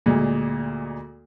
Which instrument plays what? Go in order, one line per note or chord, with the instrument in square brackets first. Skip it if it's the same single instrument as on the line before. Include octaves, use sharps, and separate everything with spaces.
[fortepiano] D2 A#2 G#3